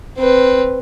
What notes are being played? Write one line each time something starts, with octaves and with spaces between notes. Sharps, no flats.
C4 B4